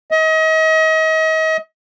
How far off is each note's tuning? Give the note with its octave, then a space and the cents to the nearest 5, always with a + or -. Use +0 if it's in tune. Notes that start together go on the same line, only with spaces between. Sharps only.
D#5 +35